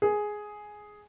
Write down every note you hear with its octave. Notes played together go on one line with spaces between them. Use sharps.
G#4